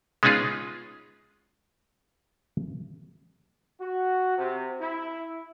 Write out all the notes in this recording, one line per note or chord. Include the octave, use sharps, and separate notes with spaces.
G#3 B3 C#4 D#4 F4 G#4
F#4
C3
E4